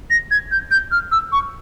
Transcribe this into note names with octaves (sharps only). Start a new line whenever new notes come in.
A#6
G#6
G6
G6
F6
E6
C#6